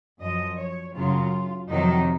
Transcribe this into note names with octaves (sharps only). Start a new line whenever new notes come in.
F#2 F3 D#5
C#5
F#2 C#3 F#3 F4
F2 C3 D#3 F#3 D#4